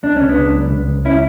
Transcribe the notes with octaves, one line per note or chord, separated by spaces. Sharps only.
C#2 D4
C#2 C#4
B3 D4
C#2
F#3
C#2
C#2
C#4 E4